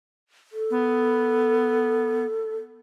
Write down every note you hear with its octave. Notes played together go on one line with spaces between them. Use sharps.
A4
B3